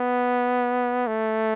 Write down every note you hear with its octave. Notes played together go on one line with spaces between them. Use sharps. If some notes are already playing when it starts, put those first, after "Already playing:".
Already playing: B3
A3